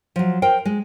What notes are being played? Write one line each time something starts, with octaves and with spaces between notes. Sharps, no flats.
F3 F#3
A#4 C5 G5
G#3